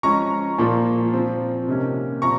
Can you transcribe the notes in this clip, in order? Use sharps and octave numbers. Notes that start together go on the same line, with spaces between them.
F3 G#3 C#4 A#5 C#6
A#2 F3 A#3
F3 C4
C3 D#3 A#3 C#4
A#2 F3 C4 A#5 C#6